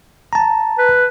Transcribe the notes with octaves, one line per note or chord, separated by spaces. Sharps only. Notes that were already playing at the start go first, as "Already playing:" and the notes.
A5 A#5
B4